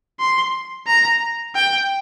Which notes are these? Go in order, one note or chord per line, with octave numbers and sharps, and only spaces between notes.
C6
A#5
G5